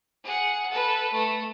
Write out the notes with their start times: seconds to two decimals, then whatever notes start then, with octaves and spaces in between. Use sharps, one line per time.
0.24 G#4 F#5
0.70 A4 B4
1.12 A3